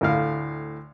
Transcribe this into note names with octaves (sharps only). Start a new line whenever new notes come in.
D2 A2 F5